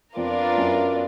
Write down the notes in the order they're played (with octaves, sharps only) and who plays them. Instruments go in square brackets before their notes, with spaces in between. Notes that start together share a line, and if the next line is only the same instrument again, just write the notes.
[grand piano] F2 [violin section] B3 D4 F4 A#4 D5
[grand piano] F#2